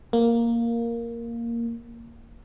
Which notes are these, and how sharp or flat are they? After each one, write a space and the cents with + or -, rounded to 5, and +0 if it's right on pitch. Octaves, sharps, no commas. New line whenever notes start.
A#3 +0